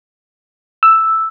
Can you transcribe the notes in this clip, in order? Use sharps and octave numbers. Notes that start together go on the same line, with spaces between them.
E6